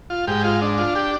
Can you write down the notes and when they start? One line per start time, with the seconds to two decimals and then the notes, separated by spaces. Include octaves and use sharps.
0.10 F4
0.27 G#2 G4
0.44 F4
0.62 D4
0.78 F4
0.95 G4